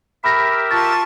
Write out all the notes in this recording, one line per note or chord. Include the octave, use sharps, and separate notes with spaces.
G4 A#4 E5 B5 A#6
F4 A5 C#6 A6